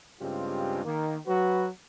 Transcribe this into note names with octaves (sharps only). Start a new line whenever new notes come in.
G2 C#3 G#3 C4 F4 G4
D#3 A#3
F#3 F#4 B4